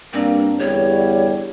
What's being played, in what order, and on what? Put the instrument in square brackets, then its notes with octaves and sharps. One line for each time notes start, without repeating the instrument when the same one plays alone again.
[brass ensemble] G2 A#3 D4 [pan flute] C4
[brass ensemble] E2 D3 G3 [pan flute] C#5